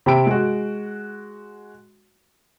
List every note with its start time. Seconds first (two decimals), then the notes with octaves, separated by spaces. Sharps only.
0.06 C3 G4 G5 B5 E6 D7
0.26 G#3 F#4